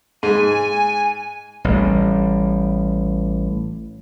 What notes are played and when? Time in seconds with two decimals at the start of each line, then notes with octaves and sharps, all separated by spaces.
0.23 G#2 G#5
1.64 A1 G3